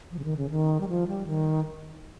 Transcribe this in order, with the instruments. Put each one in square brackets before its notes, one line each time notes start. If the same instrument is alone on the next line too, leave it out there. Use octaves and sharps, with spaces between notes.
[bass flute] F3
C#3
D#3
C#3
D#3
G3
F3
G3
D#3